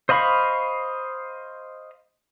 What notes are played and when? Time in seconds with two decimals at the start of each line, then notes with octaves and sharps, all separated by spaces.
0.09 C5 D#5 F5 B5 C#6